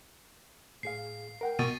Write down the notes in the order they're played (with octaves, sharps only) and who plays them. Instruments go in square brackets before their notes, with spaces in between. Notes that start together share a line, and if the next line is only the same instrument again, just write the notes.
[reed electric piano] A2 G#4 F5 [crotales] C7
[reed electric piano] A#4 F#5 G5
[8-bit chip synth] B2 [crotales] C#6 A6 D#7